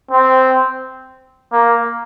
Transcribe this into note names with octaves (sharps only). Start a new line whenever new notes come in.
C4
A#3